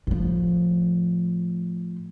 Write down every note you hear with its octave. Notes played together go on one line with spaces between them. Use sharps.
A2 F3